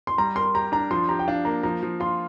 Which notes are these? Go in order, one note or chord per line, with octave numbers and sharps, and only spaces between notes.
C6
G3 A#5
A#4 C6
G4 A#5
D4 A#5
F3 C6
G4 A#5
G5
D4 F5
A#3 A#5
F3 A#5
F3
F4 C6